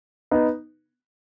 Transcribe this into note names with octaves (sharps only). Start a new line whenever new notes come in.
B3 D#4